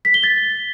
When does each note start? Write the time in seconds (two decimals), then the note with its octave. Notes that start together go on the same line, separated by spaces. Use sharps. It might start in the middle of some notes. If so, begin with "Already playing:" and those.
0.05 B6
0.14 G7
0.24 A6